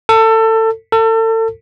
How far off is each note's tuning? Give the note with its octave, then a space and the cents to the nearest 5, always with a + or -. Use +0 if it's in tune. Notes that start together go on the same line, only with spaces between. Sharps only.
A4 +25
A4 +35